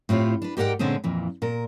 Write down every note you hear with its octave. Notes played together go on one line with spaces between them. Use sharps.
A2 C4 F4 G4 C#5
D4 B4
G#2 G4 A#4 D5 F#5 G5
A#2 D3 G#3 C4 C#4 G#4
F2 A#2 E3
A#2 A#4